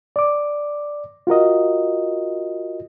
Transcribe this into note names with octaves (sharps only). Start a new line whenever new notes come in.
D5 D6
F4 F#4 A#4 D#5